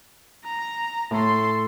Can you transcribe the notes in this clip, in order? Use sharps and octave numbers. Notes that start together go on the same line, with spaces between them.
A#5
A2 A4 C6